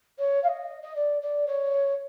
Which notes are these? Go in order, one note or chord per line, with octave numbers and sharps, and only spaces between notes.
C#5
F5
D#5
D#5
D5
D5
C#5